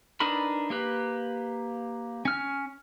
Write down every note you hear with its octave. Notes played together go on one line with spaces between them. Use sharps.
D4 D#4 A#4 B4 B5
A#3 G4 B4
C#4 F6